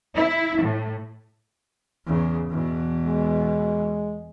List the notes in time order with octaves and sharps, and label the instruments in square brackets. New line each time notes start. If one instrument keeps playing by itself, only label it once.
[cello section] E4
A2
[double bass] E2 C#3
E2 B2
[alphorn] G#3